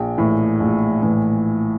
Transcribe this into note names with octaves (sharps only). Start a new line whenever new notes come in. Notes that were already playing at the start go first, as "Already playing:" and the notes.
Already playing: A#1 G5
A2 E3
A#1
A2 E3